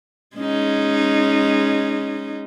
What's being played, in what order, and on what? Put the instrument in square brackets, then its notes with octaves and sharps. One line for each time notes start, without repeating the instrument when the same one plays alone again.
[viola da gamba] G#3 C#4 D#4